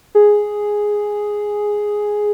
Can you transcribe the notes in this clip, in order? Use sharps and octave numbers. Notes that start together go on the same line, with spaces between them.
G#4